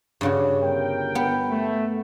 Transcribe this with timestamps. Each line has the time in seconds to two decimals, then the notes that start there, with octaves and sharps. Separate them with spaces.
0.21 G2 C#3 F#4
0.62 G1 A#4 G5
1.15 B3
1.50 A3